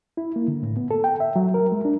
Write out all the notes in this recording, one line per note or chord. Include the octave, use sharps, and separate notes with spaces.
E4
A#3
D3
A2
B3
A4
G5
E5
F#3
A#4
G#3
D4